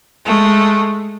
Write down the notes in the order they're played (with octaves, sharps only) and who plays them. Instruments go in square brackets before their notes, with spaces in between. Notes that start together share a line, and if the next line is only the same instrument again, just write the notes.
[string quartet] G#3 A3